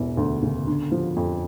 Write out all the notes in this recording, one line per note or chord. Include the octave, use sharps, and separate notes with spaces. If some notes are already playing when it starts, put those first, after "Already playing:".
Already playing: E1 E3
D2
C#3
D3
F3
F2